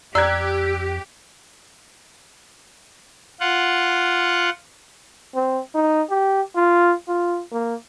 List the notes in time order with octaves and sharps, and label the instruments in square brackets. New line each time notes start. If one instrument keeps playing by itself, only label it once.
[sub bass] F2 [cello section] G4 [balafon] D5 A#5 [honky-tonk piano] E6 F#6 G#6
[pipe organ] F4 F#5
[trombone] C4
D#4
G4
F4
F4
A#3